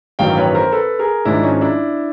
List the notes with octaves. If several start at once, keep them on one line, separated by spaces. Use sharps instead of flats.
A1 G2 D#3 F#3 F5 G5
B4 C#5
A#4 C5
A4 B4
G#4 A#4
G#1 G#2 F3 G#3 D4 E4
C#4 D#4
D4 E4